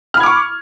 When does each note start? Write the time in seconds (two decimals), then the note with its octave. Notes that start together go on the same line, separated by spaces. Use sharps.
0.14 F6
0.17 B5
0.20 G#6
0.23 D6
0.26 C#6